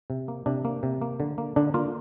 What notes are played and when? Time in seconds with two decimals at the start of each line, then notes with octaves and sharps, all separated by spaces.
0.10 C3
0.28 A#3
0.46 C3 D4
0.65 A#3
0.83 C3
1.01 A#3
1.20 D3
1.38 A#3
1.56 D3 D4
1.74 A#3 F4